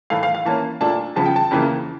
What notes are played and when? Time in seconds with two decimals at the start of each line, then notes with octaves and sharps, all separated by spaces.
0.10 A2 E3 A3 F5
0.23 F5
0.35 F5
0.45 E3 A#3 C#4 A5
0.80 A#2 A3 D4 F4 A5
1.16 E2 C#3 F3 A5
1.26 G5
1.36 A5
1.51 F2 C#3 E3 A#3